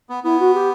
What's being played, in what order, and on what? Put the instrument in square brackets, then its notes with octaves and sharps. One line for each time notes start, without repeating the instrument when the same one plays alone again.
[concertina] B3
[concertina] B3 [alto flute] E4
[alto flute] F#4
G4